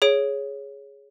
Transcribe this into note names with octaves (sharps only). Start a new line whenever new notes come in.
G#4 C#5 D7